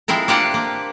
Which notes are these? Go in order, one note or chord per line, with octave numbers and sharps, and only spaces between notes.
F3 G#3 C4 E4 A#4
A#3 D4 F4 G4 D5 F#5
A#3